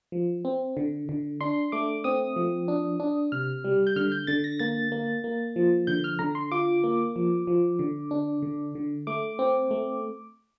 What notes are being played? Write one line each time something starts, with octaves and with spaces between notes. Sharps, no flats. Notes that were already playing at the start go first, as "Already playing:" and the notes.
F3
C4
D3
D3
D4 C6
A3 D6
C4 D#6
F3
D4
D4
C3 F6
G3
G6
D3 F6
G6
D3 A6
A#6
A#3 A6
A#3
A#3
F3
D3 G6
F6
D3 A#5
C6
F4 D6
A#3
F3
F3
D3
D4
D3
D3
A3 D6
C4
A3